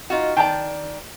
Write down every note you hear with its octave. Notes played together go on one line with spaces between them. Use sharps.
D#4 F4 F#4
D#3 D5 G5 A5